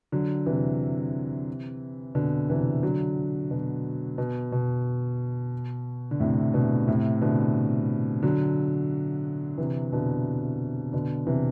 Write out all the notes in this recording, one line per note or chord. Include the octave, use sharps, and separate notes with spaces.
D3 F#3
C3 E3
B2 D3
C3 E3
D3 F#3
B2
B2
B2
D3
A2 C3
B2 D3
A2 C3
B2 D3
D3 F#3
C3 E3
B2 D3
B2 D3
C3 E3